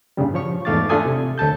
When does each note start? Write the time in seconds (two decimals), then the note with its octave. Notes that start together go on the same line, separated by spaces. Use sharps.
0.17 G2 A#2 C#3 G3
0.34 F3 C#5 C#6
0.65 E2 G#2 A3 F5 D6 A6
0.89 A3 D4 F4 A4 G#5 D#6
1.05 C3
1.38 D2 A4 A5 G6